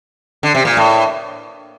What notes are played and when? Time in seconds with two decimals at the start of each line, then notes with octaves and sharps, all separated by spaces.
0.43 D3
0.55 C3
0.65 A#2
0.77 A2